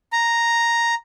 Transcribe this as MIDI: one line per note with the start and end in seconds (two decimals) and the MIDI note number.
0.13 0.94 82